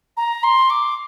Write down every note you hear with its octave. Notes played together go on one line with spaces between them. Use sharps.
A#5
C6
D6